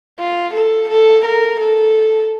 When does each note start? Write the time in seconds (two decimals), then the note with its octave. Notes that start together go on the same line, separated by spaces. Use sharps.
0.19 F4
0.54 A4
0.89 A4
1.25 A#4
1.60 A4